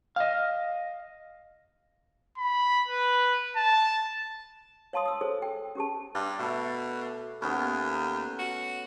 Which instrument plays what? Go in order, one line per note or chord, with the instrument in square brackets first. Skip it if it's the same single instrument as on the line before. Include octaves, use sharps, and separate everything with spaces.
[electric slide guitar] D#5 F5
[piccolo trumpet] B5
B4
A5
[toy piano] C#5 F5 A5 C6 D#6
D#6 E6
G#4 A4 C5 C#5
G5
C#4 G4 G#4 A5
[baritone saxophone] G2 [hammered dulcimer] D5
[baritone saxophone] B2 [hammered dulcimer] A3 A4
[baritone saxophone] D#2 [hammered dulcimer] B3 C#4
[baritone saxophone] F#4